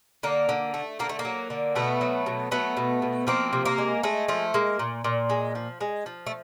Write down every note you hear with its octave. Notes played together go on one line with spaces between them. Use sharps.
D3 A#3
D3
A3
D3 A#3
A3
A#3
F#3
D3
B2 A3 B3
F#3
B2
F#3 A3 B3
B2
B2
F3 A#3 C4
C3
A#3
G#3
G#3 A3
F3 A3
G#3 A#3
A#2
A#2
G#3
F3
G#3
F3
A3